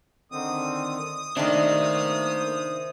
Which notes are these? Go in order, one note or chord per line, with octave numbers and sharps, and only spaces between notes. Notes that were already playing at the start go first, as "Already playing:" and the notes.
D3 D#3 C4 D#6
D#3 A3 A#3 D4 C5 E5